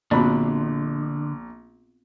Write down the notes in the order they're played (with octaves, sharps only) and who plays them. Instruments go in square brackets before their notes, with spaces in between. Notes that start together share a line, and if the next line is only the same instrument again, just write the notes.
[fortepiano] A#1 B5 [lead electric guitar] D3 [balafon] B3 C4 F#4